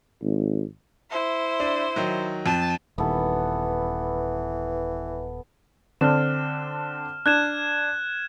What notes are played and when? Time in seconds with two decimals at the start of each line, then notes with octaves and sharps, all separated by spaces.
0.22 G#1
1.10 E4 C5
1.60 D4
1.96 D#3 F#3
2.46 F2 A5
2.98 D#1 D#2 E3 B3 A4
6.01 D3 C4 D4 F6 E7
7.26 D4 F#6 G#6 E7